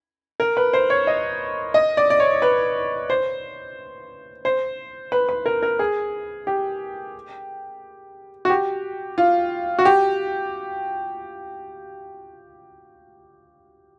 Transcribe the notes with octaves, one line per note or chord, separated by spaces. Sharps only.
A#4
B4
C5
C#5
D#5
D#5
D5
D5
C#5
B4
C5
C5
B4
B4
A#4
A#4
G#4
G4
F#4
G4
F4
F#4
G4